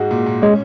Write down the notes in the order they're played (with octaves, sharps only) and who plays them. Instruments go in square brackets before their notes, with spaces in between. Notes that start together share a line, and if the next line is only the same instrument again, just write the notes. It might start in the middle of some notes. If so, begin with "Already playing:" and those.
Already playing: [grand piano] G#2 G#3 F#4
A#2
A#2
[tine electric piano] G#3 [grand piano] C#4